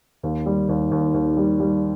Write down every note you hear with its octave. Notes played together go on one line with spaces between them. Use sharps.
D#2
G3
D#2
D#2
D#2
G3
G3